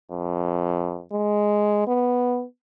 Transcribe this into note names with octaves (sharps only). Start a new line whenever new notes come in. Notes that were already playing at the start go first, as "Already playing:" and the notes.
F2
G#3
B3